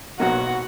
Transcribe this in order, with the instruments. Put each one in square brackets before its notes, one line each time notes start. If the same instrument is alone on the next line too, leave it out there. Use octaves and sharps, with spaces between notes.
[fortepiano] B1 B2 F#3 A#3 D#4 [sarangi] F#4